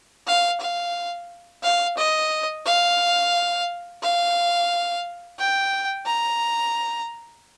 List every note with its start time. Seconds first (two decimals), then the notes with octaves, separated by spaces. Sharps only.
0.27 F5
0.60 F5
1.63 F5
1.97 D#5
2.66 F5
4.02 F5
5.39 G5
6.06 A#5